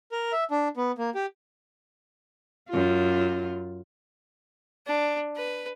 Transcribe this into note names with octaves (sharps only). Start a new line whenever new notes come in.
A#4
E5
D4
B3
A#3
G4
F#2 F4
D4
B4